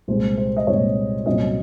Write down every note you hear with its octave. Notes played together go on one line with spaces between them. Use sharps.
C2 A#2 G#3 C5
C5
D#5
C2 A#2 G#3 C#5
C2 A#2 F#3 C#4 D#5